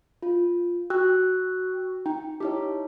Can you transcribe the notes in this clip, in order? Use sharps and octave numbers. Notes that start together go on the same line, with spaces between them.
F4
F#4 G5 E6 F#6
D#4 G5
D#4 E4 G4 C#5